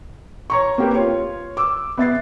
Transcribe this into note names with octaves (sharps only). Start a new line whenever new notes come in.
C#5 A#5 C#6
A#3 C4 G4 A#4 B4
F4 C#5
D6 E6
B3 E5 A6 C7